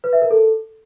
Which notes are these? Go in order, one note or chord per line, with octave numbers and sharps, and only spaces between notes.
B4
E5
A#4
A4